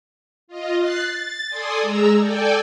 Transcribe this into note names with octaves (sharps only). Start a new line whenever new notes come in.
F4 D#5
F#6 A6 C7
A6
A4 D5 G#5 C6 D#6
G#3 G#4 A#5 E6
A4 D5 G5 G#5